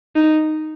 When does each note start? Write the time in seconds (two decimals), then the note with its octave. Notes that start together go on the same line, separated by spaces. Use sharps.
0.16 D#4